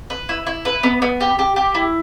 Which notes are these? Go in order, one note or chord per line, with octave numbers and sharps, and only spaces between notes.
B4
E4
E4
B4
B3
B3
G4
G4
G4
E4